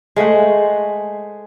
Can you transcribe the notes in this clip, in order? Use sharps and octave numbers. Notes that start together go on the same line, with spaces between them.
G#3 A3 C5 F#5